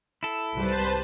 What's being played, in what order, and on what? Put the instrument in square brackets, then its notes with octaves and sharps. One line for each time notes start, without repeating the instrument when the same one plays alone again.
[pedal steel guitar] E4 A4
[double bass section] C2 G#2 G3 [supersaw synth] B4 C5 A5